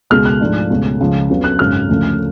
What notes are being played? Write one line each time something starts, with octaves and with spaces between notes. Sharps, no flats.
C#2 B2 G#3 F6
F#6
G#2 F3 A3 D4 F4
C#2 B2 A3 C#4
C#2 C#3 F3
F2 C#3 F#3 B3
F#6
G#1 F#2 C#3 F6
D2 C#3 F3 A3 C#4